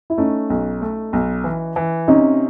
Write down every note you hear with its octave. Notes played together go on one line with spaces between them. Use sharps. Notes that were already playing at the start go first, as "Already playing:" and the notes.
E4
A3 C#4 D#4
B1
A3
B1
E3
E3
C3 C#4 D#4